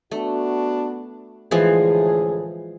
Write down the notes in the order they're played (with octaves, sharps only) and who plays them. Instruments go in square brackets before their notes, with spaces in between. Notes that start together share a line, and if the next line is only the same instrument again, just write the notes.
[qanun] A3 [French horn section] B3 D4 F#4
[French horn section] D2 A2 G#4 [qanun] E3 F3 G#3